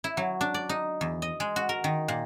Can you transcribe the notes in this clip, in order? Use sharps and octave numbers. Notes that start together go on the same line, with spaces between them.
E4
F#3
D4
D5
D#4
E2
D#5
G#3
F#4
A#4
D#3
A#2